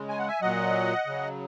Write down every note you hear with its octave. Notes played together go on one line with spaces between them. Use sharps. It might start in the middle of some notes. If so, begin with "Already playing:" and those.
Already playing: C#3 G#3
G#5
F#5
E5 G#5
A#2 F#3 D#5 F#5
C#3 F#3